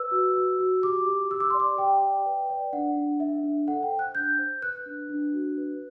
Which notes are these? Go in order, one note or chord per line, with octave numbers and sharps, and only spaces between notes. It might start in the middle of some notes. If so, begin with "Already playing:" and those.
Already playing: B4 E6
F#4
F#4
F#4
G4 D6
G4
G4 E6
D6
D5 C6
D6
G4 G5
D5
B4
D5
D4 F#5
D4
D4 E5
D4
A4 F#5
G5
C5
F#6
D4 G6
C5
B4 F#6
D4
D4
F#4
B4